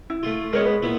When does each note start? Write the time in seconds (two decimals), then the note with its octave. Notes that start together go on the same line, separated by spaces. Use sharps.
0.10 E4
0.23 A3 F4
0.53 G#3 B3 A#4 C#5
0.66 B4
0.82 A#2 B3 E4